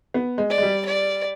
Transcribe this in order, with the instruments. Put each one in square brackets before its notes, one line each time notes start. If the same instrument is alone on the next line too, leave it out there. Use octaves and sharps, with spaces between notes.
[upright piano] B3
G#3
[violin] D5
[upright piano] G#3
G3
[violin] D5